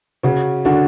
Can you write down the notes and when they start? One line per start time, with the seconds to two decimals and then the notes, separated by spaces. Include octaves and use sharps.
0.23 C#3 C#4 F#4
0.65 D3 D4 F#4